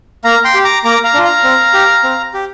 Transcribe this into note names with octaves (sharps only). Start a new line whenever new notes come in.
A#3 F5 A#5
G5 C6
G4
A#5 D6
A#3 A#5 D6
F5 A#5
D4 F4
F5 A#5
C4
G4
C4
G4